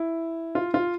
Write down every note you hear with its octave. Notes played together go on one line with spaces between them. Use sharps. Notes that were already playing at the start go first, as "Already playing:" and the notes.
Already playing: E4
F4
F4